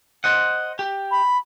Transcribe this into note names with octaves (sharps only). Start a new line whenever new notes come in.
C5 D#5 F#5
G4
B5